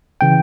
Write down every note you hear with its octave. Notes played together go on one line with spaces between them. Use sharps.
C#3 E3 G5